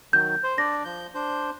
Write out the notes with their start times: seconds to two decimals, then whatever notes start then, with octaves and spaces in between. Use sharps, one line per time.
0.13 D#3 F#3 G6
0.44 C5
0.58 D4 D5 A#6
0.85 F3 G6
1.15 D4 C5 G6